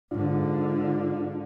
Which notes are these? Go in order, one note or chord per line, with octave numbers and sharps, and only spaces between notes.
G#2 D3 D4 F4